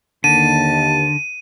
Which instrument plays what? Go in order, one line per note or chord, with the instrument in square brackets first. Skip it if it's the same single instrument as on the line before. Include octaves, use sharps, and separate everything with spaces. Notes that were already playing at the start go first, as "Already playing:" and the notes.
[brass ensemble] D#2 [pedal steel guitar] D3 [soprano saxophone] A5 [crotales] D#7